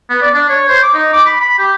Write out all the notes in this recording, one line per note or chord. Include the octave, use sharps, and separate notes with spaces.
B3
D5
D4
C#5
C5
D6
D#4
D6
B5
B5
G4